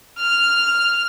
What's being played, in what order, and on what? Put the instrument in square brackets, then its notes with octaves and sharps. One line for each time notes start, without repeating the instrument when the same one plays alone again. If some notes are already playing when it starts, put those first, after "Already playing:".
[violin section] F6